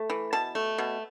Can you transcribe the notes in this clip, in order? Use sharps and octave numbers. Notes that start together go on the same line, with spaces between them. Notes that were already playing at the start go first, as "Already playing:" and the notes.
Already playing: A3
E3
B2 A5
A3
B2